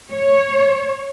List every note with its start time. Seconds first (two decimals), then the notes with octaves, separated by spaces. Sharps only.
0.12 C#5